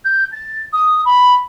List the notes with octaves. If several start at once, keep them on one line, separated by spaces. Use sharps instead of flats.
G6
A6
D#6
B5